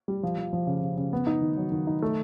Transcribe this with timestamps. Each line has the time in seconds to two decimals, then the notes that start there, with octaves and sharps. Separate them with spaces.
0.08 G3
0.23 F3
0.38 F3
0.53 F3
0.67 C#3
0.82 C#3
0.97 C#3
1.13 B3
1.27 D#4
1.42 D#3
1.57 F#3
1.72 D#3
1.87 D#4
2.02 A3